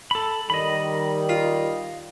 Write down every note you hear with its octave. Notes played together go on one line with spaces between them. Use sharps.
A4 B5
D#3 G3 D#5 B5
F4